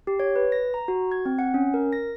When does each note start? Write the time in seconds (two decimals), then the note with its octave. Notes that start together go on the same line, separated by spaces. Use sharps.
0.07 G4
0.20 C#5
0.36 B4
0.52 A#6
0.74 A#5
0.88 F#4
1.12 G#6
1.25 C4
1.39 F#5
1.54 C#4
1.74 A#4
1.93 A#6